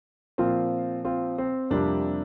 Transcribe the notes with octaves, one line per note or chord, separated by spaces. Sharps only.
A#2 F3 C4 F4
C4 F4
C4
F2 C3 G3 A#3 D4